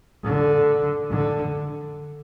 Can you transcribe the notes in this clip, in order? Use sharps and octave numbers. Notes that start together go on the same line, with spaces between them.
D3
D3